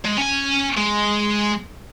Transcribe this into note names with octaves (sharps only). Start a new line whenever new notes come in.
G#3
C#4 G#5
G#3